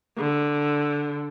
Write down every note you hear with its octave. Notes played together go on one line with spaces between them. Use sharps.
D3